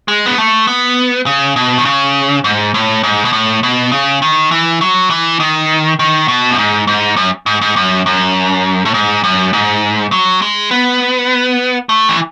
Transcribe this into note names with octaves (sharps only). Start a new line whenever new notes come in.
G#3
B3
A3
B3
C#3
B2
D#3
C#3
G#2
A2
G#2
B2
A2
B2
C#3
D#3
E3
F#3
E3
D#3
D#3
B2
F#2
G#2
G#2
F#2
G#2
G#2
F#2
F#2
A2
G#2
F#2
G#2
F#3
G#3
B3
A3
E3